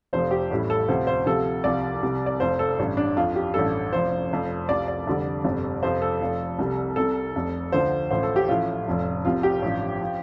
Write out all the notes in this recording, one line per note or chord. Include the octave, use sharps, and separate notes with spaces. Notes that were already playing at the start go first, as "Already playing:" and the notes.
F1 F2 C3 F3 C5
G4
A1 A2 G3
A4
D2 C3 F3 C5
C5
D2 C3 F3 A4
C2 C3 F3 D5
C2 C3 G3
D5
F1 F2 F3 C5
A4
A1 G2 G3
D4
F2 F3 F4
G4
A1 G2 G3 A4
F1 F2 F3 C5
F1 F2 F3
C2 C3 F3 D5
D5
F1 F2 D3 G3
G1 F2 C3 G3
F2 C3 F3 C5
A4
F1 F2 F3
C2 C3 G3
C2 C3 G3 A4
F1 F2 C3
D2 D3 F3 C5
A1 A2 F3 C5
A4
G4
A1 A2 F3 F4
F1 F2 F3
C2 C3 F3 F4
G4
A1 G2 F3
F3